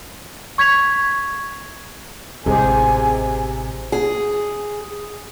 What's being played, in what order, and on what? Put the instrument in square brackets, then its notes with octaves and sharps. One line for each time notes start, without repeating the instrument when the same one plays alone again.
[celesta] C#6 G#6 B6 F7
[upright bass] A1 [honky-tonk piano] C3 G#3 [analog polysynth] G4 G#4 C5 [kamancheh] G#5
[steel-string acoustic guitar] G#4